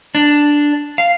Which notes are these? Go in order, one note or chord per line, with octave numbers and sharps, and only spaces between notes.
D4
F5